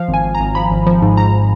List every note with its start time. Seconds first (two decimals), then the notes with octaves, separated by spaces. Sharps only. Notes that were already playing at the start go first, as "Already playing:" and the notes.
Already playing: F3 F5
0.08 G#1
0.14 G#5
0.24 G#1
0.35 A#5
0.40 G#1
0.55 F3 B5
0.71 G#1
0.87 F3
1.02 G#2
1.17 G#2 A#5